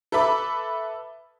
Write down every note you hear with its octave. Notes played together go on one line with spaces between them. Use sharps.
A4 B4 E5 B5 D6